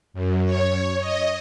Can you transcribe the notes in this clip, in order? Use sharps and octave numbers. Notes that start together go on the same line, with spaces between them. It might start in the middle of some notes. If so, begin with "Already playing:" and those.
F#2
C#5
D#5